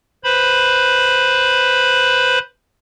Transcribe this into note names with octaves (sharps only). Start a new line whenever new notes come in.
B4 C5 B5